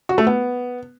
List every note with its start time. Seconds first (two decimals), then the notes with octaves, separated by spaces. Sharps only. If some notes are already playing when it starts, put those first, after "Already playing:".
0.09 F#4
0.18 A3
0.27 B3